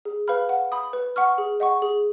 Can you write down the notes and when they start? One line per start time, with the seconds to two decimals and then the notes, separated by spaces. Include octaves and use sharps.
0.05 G#4
0.28 B4 F5 B5 F6
0.49 F#5
0.72 B5 D#6
0.93 B4
1.16 F#5 C#6 F6
1.38 G#4
1.60 D#5 F#5 C#6
1.82 G#4